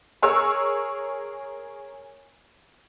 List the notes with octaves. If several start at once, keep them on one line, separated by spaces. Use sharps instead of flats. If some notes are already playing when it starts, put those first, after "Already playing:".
G#4 A#4 C#5 C#6 E6